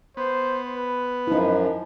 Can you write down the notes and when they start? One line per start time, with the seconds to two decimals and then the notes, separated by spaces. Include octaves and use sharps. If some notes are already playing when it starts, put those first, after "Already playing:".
0.17 B3 C5
0.76 B4
1.27 F#2 F3 D#4 E4